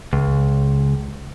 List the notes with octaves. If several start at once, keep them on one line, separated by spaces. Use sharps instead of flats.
C#2